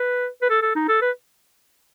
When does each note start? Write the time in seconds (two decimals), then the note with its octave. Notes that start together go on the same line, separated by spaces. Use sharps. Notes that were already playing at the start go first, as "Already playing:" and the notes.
Already playing: B4
0.42 B4
0.50 A4
0.62 A4
0.75 D#4
0.88 A4
1.01 B4